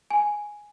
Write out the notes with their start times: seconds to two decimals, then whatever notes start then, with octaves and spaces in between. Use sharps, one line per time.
0.11 G#5